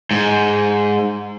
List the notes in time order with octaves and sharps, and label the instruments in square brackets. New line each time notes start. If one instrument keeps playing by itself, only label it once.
[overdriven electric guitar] G#2